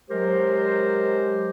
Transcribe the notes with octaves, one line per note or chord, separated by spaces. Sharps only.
F#3 G#3 G4 A#4 C5